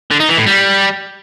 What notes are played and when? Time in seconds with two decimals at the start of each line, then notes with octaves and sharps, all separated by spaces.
0.11 D3
0.20 D#4
0.28 E3
0.37 A2
0.46 G3